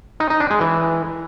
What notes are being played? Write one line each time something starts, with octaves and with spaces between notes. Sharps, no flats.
D#4
D#4
D4
G#3
E3